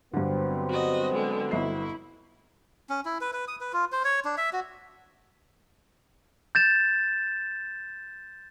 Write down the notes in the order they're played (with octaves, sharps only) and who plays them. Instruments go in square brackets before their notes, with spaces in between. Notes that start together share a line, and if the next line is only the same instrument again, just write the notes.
[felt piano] G2 D3 [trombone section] F#3 B3 C4
[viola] F#4 D#5
D3 G#3
[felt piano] G1 D#5 C7 [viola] E4
[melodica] C#4
E4
B4
B4
D#6
B4
F4
C5
C#5
D4
E5
F#4
[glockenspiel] G6 A6 E7